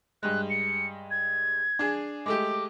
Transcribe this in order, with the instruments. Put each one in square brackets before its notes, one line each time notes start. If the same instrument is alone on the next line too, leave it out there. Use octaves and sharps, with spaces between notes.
[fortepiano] G2 G#3 [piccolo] F#6
[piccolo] C#7
G#6
[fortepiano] D4 G#4
[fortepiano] G#3 A3 G4 [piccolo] D6